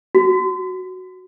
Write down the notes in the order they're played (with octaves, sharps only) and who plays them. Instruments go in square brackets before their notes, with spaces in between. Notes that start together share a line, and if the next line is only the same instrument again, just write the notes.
[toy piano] F#4